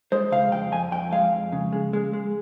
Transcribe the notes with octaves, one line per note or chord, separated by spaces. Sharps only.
G#3 C5
C#3 F5
F2 G5
F2 G#5
F2 G5
G#3 F5
F2
C#3
G#3
G#3
G#3